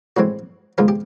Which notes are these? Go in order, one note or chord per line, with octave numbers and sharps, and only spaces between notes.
A2 E3 G#3 C4 F#4
G#2 D#3 G#3 B3 F4
G4